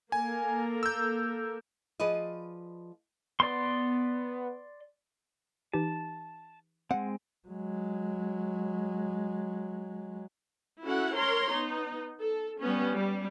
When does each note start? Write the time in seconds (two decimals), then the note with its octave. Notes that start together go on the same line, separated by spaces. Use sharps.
0.12 A#3 A4 A#4 G#5
0.83 E6 G6
2.00 F3 G#4 B4 D5 D#5
3.40 B3 D5 C6
5.73 E3 D#4 G4 A5
6.91 G#3 C4 F#5
7.48 F#3 G#3
10.83 C#4 E4 F#4 A4 F#5
11.17 A#4 C#5 A#5 C6
11.52 B3 D#4
12.19 A4
12.61 G3 B3 C#4
12.95 G3